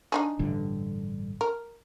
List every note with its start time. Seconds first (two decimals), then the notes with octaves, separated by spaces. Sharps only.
0.12 D4 D#4 G#4
0.39 A1 G2 D3
1.41 A#4